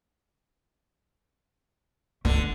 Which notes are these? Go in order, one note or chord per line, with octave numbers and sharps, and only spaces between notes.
D#1 C#2 D3 A3